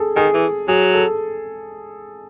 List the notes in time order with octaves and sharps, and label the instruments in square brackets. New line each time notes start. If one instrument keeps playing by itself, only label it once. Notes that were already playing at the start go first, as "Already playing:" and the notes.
Already playing: [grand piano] G#4 A4
[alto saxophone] D#3 [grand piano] G#4
[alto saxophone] E3
[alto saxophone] F#3 [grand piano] G#4
[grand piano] A4